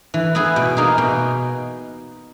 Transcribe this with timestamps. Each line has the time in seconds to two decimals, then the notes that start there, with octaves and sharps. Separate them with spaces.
0.14 E3
0.35 B3 E4 G#4
0.56 B2
0.77 A#3 D#4 G#4
0.98 B2